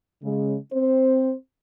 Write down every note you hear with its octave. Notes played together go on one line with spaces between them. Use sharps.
C#3 G#3
C4 C5